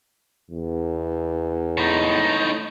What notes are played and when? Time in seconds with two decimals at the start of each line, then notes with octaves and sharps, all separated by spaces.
0.50 E2
1.77 A2 D#4